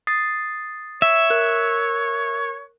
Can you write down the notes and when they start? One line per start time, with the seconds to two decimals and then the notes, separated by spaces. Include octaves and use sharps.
0.07 D#6 A6 C7
1.02 C#5 E5
1.30 A#4 F#6